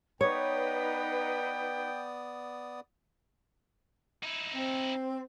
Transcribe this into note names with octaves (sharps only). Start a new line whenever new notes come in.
B3 D#4 B4 C#5 D5 G5 D#6
D#4 E4
C4